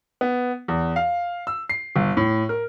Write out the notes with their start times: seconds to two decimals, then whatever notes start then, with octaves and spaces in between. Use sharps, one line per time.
0.21 B3
0.68 E2
0.96 F5
1.47 E6
1.70 C7
1.96 G1
2.17 A2
2.49 A#4